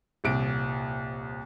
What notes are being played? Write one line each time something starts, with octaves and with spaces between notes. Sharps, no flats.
D#1 C2 D7